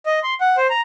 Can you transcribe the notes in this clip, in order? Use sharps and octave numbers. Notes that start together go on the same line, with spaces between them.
D#5
C6
F#5
C5
A#5